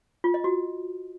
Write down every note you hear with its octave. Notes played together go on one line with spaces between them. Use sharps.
F4
D#5
F#4